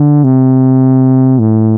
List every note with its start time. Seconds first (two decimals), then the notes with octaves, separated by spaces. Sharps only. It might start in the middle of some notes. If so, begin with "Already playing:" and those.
Already playing: D3
0.24 C3
1.40 A2